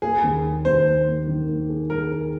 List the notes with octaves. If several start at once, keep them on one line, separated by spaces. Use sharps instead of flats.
A#3 G#4
D#2
A#3
D#2 C5
A#3
A#3
D#3
A#3
G#4
G#4 A#4
G#4